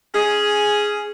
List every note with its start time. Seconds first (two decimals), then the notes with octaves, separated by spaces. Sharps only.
0.14 C#4 G#4